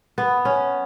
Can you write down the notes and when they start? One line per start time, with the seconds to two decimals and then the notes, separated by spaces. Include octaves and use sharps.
0.18 B3
0.45 C#4